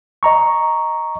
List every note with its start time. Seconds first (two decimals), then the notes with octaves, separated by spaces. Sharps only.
0.23 D#5 A#5 C#6